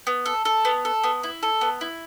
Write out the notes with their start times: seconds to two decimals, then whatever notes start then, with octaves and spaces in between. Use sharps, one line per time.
0.07 B3
0.26 A4
0.45 A4
0.65 B3
0.85 A4
1.04 B3
1.23 E4
1.43 A4
1.61 B3
1.81 E4